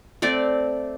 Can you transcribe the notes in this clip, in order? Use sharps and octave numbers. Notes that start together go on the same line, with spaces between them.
A3 C4 D5